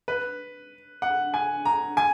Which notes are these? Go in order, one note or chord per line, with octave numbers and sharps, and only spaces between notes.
B4
F#5
G#5
A#5
G#5